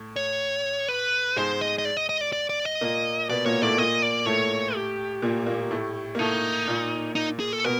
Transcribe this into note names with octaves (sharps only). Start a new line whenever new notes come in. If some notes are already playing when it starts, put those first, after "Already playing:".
Already playing: A2
C#5
B4
G#2 G#3 C5
D#5
D#5
D5
D#5
D#5
D5
D5
D5
D#5
A#2 A#3
B2 B3 D5
A#2 A#3 C#5
A2 A3 D5
A#2 A#3 D#5
D5
A2 A3 C#5
G4
A#2 A#3
A#2 A#3
A2 A3
A#3
A2 A3 D#4
A#2 A#3
D#4
G#4
A4
B2 B3 A#4